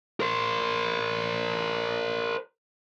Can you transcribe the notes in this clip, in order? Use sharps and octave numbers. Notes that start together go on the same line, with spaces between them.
A#4 C5